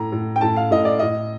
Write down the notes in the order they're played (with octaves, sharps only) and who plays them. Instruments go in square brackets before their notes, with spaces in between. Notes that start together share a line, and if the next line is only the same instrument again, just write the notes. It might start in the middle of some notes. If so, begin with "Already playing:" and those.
Already playing: [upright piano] A2 A#5
A2
G5
A2 A5
F5
A2 D#5
D5
A2 D#5